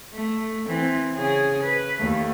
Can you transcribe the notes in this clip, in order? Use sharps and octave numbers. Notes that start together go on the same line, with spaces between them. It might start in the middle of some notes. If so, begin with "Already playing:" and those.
A3
E3 C4
C#3 G#4
B4
D#2 A3